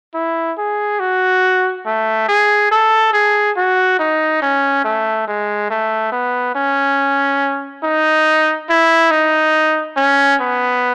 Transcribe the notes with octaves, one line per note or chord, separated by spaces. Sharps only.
E4
G#4
F#4
A3
G#4
A4
G#4
F#4
D#4
C#4
A3
G#3
A3
B3
C#4
D#4
E4
D#4
C#4
B3